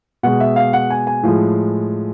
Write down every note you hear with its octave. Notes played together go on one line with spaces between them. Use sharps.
B2 G#3 F#5
E5
F5
F#5
G#5
G#5
A2 F3 G#3